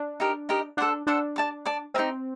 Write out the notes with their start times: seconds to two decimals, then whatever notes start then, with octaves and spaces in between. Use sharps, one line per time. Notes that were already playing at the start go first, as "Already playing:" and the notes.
Already playing: D4
0.20 D#4 G4 A#4 D#5
0.49 D#4 G4 A#4 D#5
0.77 D4 A4 C5 F#5
1.07 D4 A4 C5 F#5
1.36 D5 A5 D6
1.65 D5 A5 D6
1.94 C4 D#4 G4 A#4 D#5